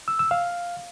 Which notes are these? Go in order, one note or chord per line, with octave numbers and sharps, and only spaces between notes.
E6
E6
F5